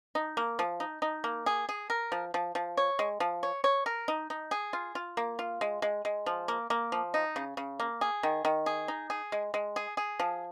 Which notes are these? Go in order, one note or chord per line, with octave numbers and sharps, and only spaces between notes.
D#4
A#3
F3
D#4
D#4
A#3
G#4
G#4
A#4
F3
F3
F3
C#5
G#3
F3
C#5
C#5
A#4
D#4
D#4
G#4
F4
F4
A#3
F4
G#3
G#3
G#3
F3
A#3
A#3
F3
D#4
C#3
C#3
A#3
G#4
D#3
D#3
G#4
D#4
G#4
G#3
G#3
G#4
G#4
F3